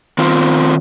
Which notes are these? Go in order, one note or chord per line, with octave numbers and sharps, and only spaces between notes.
D#3 C4 F4 C5